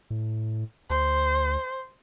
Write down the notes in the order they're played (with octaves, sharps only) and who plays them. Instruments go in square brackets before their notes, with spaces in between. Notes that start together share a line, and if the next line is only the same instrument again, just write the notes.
[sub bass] A2
[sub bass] D2 [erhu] C5